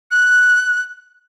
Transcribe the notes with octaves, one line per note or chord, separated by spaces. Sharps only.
F#6